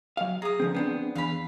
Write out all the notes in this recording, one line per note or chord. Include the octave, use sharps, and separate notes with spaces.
F#3 F5
G#4 A#5 D#6
D3 F3 C4
B3 C4 D4
E2 F5 B5